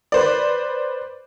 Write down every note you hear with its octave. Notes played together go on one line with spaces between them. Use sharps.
B4 C5 D5